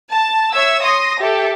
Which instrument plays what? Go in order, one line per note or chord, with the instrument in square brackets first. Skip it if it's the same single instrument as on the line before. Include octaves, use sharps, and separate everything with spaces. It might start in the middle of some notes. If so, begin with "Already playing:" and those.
[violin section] A5
C#5 E5 E6 G#6
C6 D#6 A#6
G4 A4 E5